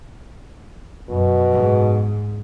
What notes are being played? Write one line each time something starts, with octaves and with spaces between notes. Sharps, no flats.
F#2 B2
G#2